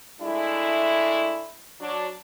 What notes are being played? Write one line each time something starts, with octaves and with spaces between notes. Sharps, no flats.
G#3 A3 D4 E4
F#3 D4